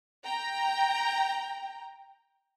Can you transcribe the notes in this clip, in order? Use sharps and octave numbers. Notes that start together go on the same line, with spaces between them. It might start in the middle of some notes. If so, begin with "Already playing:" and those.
G5 A#5